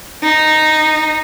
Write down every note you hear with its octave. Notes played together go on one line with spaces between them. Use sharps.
D#4